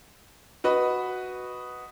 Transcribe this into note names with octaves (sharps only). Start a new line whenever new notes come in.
F#4 B4 D#5